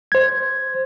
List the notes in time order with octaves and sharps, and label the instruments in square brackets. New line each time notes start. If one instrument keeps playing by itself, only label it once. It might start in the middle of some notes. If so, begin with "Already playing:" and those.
[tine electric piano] C5 G#6